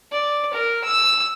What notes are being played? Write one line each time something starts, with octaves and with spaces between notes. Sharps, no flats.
D5
A#4
E6